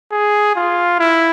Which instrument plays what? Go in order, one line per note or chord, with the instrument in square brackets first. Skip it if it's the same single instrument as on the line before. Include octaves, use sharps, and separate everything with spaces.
[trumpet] G#4
F4
E4